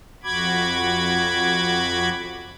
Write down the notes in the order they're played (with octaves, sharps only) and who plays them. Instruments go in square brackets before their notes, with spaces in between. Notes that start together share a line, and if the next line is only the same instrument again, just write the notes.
[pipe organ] F2 F#4 B5 D6 G#6